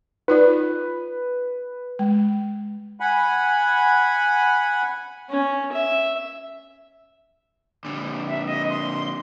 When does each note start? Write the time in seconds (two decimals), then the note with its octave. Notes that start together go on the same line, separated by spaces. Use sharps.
0.28 D#4 F4 B4 D5
1.99 G#3
3.00 F#5 G#5 B5
5.30 C#4
5.72 E5
7.85 A#2 D3
8.28 E5
8.47 D#5
8.70 C6